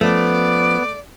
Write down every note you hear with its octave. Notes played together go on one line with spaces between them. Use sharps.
F3 A3 B3 C#4 D5